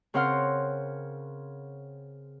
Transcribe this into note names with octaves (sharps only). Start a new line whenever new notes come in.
C#3 C4 A#4 F#5 C6 F6